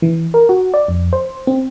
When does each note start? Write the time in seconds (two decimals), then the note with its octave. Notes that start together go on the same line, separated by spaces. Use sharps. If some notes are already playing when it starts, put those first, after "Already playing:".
0.02 E3
0.34 A#4
0.49 F#4
0.74 D5
0.88 F2
1.13 C5
1.47 C4